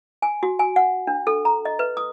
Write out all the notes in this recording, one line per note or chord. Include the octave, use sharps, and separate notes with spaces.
G#5
F#4
G#5
F#5
D4
A4
A#5
D#5
B4
D#6